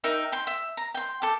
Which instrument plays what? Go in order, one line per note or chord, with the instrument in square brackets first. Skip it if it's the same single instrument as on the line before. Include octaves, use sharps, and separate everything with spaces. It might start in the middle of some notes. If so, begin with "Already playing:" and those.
[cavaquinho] D#4 A#4 E5 G5
G5 C6
E5
A#5
G5 C6
A4 D6